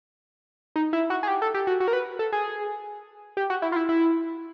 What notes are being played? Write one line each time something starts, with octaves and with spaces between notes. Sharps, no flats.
D#4
E4
F#4
G#4
G4
A4
G4
F#4
F#4
A#4
B4
A4
G#4
G4
F#4
E4
F4
E4
E4